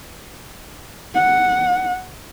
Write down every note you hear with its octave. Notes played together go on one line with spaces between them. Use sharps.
F#5